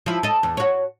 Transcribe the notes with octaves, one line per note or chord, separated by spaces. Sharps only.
F3 E4
A4 D#5
E2
F#4 C#5